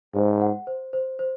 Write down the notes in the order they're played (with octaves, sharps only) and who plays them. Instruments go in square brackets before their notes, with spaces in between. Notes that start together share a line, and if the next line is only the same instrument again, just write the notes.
[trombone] G#2 [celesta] C5
[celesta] F#5
C5
C5
C5